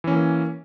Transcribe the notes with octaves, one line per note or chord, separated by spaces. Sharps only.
E3 A#3 C#4